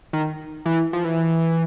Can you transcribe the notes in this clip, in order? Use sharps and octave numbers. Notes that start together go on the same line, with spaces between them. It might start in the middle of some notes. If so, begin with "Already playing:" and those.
D#3
E3
F3
E3